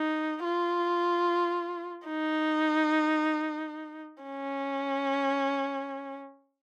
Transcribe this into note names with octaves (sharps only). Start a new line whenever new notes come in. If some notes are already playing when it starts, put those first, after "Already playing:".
Already playing: D#4
F4
D#4
C#4